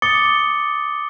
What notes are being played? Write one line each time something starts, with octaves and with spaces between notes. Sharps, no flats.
D6 D#6 A6 C#7 G7